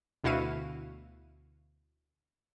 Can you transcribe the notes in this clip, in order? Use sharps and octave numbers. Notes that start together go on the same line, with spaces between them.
D2 B2 E4 F#4 F5 D#7